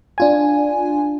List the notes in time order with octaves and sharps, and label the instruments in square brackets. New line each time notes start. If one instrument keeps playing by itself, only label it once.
[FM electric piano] D4 F4 G#5